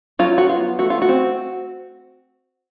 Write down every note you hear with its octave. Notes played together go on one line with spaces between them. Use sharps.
F#3 F4
F#4
B3 F4
A3 F#4
F4
F#4
C4